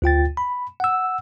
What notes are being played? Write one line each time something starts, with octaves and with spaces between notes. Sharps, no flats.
D2 F4 G5 A6
B5
F#5 E6